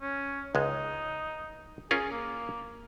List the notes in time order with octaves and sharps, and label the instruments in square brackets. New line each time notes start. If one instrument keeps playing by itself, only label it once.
[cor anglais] C#4
[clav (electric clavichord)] C#2 G#3 [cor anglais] D#4
[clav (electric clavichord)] C#4 F4 A#4 [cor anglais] G#4
[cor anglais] A#3